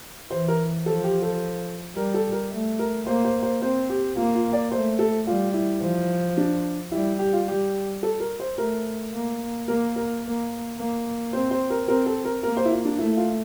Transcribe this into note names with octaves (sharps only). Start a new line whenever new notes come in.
E3 C5
A#4
F3 A4
G4
A4
G3 A#4
A4
A#4
A3
A#4
A#3 C5
C5
C5
C4 C5
G4
A#3 F4
F4
D5
A3 C5
A4
G3 F4
E4
F3
D4
G3 E4
G4
F4
G3 G4
A4
A#4
C5
A3 A#4
A#3
A#3 A#4
A#4
A#3
A#3
C4 C5
C5
A#4
C4 A#4
A4
A#4
A#3 A#4
C5
E4
F4
D4
A3 E4
F4